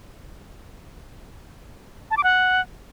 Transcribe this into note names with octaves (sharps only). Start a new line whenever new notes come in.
A5
D6
F#5